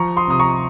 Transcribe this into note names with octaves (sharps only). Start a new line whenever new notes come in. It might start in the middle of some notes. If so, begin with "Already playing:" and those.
Already playing: F3 A#5 C#6
C6 D#6
C3 D#6
A#5 C#6